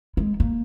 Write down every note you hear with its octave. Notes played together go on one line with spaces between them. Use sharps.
G#3
A#3